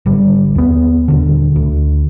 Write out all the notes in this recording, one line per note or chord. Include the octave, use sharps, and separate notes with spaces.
G#1 D3 G3
D#2 B3
D#1 B1 D3
D2